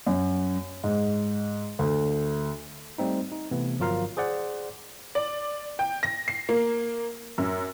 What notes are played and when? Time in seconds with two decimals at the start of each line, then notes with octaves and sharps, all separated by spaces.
0.07 F#2
0.84 G#2
1.79 D2
2.98 G3 A3 C4 D#4
3.32 D#4
3.51 C3 E3 A3 B3
3.79 G1 F3 F#3 F4 A#4 F5
4.17 G#4 C5 D5 F#5
5.15 D5
5.79 G5
6.03 A#6
6.28 C7
6.49 A#3
7.38 F#2